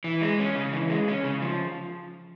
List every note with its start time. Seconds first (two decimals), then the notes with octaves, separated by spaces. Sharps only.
0.04 E3
0.21 G#3
0.39 C#4
0.56 C#3
0.73 E3
0.90 G#3
1.08 C#4
1.24 C#3
1.42 F3